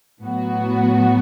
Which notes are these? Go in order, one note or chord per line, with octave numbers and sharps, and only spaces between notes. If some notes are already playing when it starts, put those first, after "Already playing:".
A2 F#3 B3 F#4